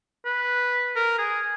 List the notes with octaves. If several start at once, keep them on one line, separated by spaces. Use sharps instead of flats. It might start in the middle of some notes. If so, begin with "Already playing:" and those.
B4
A#4
G#4